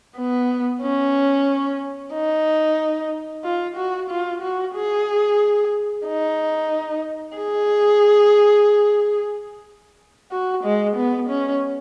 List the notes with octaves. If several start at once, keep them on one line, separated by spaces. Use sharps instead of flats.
B3
C#4
D#4
F4
F#4
F4
F#4
G#4
D#4
G#4
F#4
G#3
B3
C#4